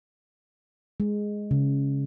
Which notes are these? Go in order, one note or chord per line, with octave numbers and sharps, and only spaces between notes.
G#3
C#3